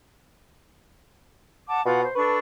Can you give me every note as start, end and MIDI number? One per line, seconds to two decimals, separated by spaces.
1.68 1.81 78
1.68 1.81 81
1.68 1.81 86
1.86 2.05 47
1.86 2.02 65
1.86 2.02 78
2.03 2.15 72
2.15 2.38 62
2.15 2.38 69
2.15 2.38 71
2.15 2.38 85